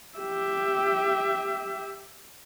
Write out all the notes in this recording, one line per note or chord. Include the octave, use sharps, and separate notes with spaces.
G4 E5